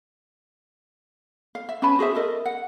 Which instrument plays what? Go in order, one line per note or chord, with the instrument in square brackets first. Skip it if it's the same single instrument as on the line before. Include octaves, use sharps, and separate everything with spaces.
[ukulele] F5
E5
C#4 B4 A5 B5
F#4 G#4 C5 E5
A4 A#4 D#5
F#5